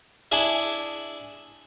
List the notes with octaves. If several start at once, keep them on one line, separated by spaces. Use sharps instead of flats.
D4 E4 G#4 E5